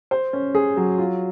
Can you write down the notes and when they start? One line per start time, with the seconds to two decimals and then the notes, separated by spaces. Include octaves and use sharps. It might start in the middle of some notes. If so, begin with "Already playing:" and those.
0.11 C5
0.33 C#4
0.55 G#4
0.77 F#3
0.98 F4